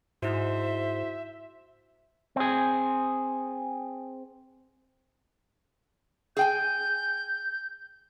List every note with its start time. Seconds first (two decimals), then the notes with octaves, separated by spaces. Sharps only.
0.22 G#2 E4 F#4 C5 E5
2.36 C4 G#4
6.37 G#4 G5 G#5 G6